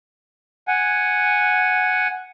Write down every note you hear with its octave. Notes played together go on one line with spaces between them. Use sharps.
F#5 G#5